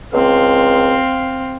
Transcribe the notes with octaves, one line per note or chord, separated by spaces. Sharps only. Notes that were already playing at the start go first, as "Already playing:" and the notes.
C#2 C4 F5